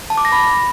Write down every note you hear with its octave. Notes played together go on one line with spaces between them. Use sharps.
A5
D6
A#6
B5